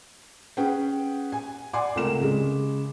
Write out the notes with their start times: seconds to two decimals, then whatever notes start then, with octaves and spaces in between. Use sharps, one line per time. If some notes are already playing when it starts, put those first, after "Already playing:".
0.57 C#4 G#4 B4 F#5 G5
1.32 G#5
1.73 D5 F#5 G#5 C6 D6
1.95 C#2 C3 A3 A#4 E7
2.21 C#3 G#3